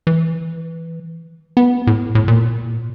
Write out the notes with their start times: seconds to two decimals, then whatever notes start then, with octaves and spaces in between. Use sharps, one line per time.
0.07 E3
1.57 B3
1.87 A2
2.15 A2
2.28 A#2